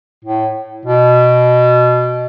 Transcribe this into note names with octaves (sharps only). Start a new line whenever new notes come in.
A2
B2